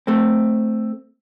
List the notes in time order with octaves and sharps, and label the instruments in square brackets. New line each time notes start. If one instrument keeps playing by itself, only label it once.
[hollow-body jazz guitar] A3 C4